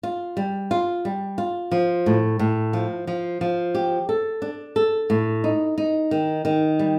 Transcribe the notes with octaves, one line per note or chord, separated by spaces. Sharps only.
F4
G3
F4
G3
F4
F3
A2
A2
F3
F3
F3
G4
A4
D4
A4
A2
D#4
D#4
D#3
D#3
G3